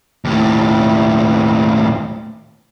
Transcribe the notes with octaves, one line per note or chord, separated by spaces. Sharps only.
D#2 A2